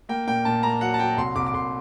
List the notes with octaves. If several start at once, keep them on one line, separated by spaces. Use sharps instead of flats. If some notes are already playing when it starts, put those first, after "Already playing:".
A#3 G5
A#2 G5
A#2 A5
A#3 A#5
F#3 F#5
A5
F#3 G5
C2 C6
C2 D6
D6
C2 C6